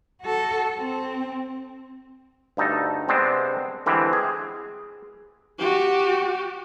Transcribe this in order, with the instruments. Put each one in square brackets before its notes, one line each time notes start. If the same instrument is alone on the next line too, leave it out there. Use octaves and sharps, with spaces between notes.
[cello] F#4 A4
C4
[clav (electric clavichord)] D2 G2 D#4 A4
C3 G#3 B3 C4 D4
D3 E3 G3 G#3 C4
G#4
[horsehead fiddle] F#4 G4